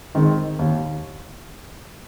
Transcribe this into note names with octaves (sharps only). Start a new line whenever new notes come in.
D#3 G#3 C4
D#2